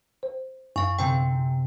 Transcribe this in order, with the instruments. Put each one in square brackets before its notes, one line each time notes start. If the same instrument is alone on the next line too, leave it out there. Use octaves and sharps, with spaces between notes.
[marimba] C5
[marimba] F#2 [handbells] F5 C#6
[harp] C3 C4 [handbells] G5 G#5